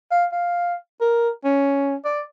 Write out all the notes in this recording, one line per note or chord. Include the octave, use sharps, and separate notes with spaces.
F5
F5
A#4
C#4
D5